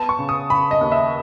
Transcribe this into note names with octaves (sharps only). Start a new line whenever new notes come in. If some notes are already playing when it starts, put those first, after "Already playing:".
Already playing: B3 A5
C#6
C#3
D#6
C#3 B5
D#5
D#2
E5